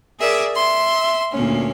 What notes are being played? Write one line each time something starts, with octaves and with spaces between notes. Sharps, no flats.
G#4 A#4 D5 E5
E5 C6
D2 A#2 C#4